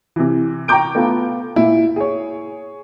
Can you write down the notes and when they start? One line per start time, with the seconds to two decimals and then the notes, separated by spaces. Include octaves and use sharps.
0.16 C3 E3
0.68 G5 A#5 C#6 D6 G6 D7
0.95 A3 B3 F4
1.56 A#2 E4
1.96 G#4 C#5